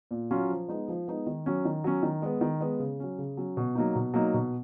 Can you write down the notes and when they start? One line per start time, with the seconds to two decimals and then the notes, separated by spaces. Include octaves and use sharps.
0.11 A#2
0.31 F#3 C#4 F4
0.50 F3
0.68 G#3 B3 D#4
0.88 F3
1.08 G#3 B3 D#4
1.27 D#3
1.46 F#3 C#4
1.65 D#3
1.84 F#3 C#4
2.03 D#3
2.22 G#3 B3
2.41 D#3
2.61 G#3 B3
2.79 C#3
3.00 F#3 C#4
3.18 C#3
3.37 F#3 C#4
3.57 B2
3.75 F#3 A#3 D#4
3.95 B2
4.14 F#3 A#3 D#4
4.34 B2